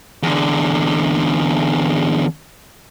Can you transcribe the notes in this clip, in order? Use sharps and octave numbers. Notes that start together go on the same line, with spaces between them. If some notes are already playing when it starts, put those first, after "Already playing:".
E2 D3